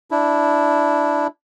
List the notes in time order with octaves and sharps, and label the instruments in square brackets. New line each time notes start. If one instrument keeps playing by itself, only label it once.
[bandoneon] D4 E4